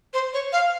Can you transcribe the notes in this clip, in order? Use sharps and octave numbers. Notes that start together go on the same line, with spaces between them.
C5
C#5
F5